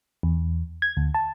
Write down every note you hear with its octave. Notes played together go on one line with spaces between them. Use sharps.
E2
G#6
D2
A5